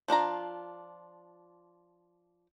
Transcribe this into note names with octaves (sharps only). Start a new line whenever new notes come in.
F3 D4 F4 A#5